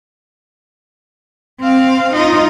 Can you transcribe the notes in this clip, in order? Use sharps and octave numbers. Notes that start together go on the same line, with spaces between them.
C4 F5
D#4 F4